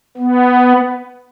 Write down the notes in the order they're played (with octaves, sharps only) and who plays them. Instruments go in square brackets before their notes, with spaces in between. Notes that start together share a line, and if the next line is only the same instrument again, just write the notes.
[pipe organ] B3